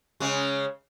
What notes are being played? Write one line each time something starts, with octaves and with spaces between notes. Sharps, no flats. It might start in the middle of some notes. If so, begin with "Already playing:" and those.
C#3 G#3